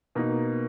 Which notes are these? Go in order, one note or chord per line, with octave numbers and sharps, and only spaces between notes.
B2 A#3 D#4